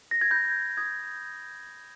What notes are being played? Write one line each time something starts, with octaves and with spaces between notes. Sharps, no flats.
A#6
G#6
B5 G6
D#6 G6 G#6